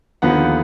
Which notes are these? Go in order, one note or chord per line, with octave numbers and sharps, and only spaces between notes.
D#2 D3 F3 B3 F#5